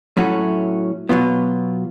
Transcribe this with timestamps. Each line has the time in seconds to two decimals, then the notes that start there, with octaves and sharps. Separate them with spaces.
0.17 A2 F#3 A3 C#4 F#4
1.09 B2 F#3 B3 F4